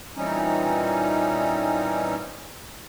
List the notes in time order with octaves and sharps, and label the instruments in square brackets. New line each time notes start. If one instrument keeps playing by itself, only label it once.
[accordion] A#2 E3 G3 C4 C#4 D#4